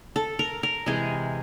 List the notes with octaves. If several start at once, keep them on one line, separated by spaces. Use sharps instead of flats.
A4
A#4
A#4
C3 E3 G#3 G#4